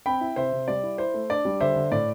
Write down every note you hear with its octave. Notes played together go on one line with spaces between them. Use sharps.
C4 G5 B5
E4
C3 C5 E5
C3
G3 D5
E4
E4 C5
A3
D4 D5
G3
D3 C5 E5
D3
A2 D5